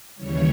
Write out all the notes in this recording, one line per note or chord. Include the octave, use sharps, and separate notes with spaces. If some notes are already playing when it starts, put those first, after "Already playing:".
D#2 C#3 E3 G3 C#5